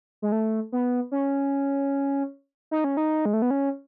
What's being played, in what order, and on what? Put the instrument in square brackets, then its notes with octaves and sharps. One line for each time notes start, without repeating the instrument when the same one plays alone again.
[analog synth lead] G#3
A3
B3
C#4
D#4
C#4
D#4
G#3
A3
B3
C#4